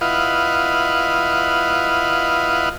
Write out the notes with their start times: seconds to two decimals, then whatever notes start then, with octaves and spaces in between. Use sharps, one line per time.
0.01 E4 F4 B4 D#5 F5 F#5